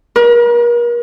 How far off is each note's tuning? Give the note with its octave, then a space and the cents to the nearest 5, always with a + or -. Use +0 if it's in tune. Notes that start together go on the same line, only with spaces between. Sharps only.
A#4 +40